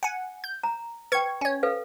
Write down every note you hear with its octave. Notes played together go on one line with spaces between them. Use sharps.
F#5 G#5
G6
A#5
B4 G5 C#6 G#6 C#7
C#4 C#5
A4 B4 F5